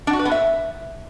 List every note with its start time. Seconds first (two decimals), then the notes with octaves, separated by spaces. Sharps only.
0.07 D4
0.13 F#4
0.19 B4
0.25 B3
0.32 E5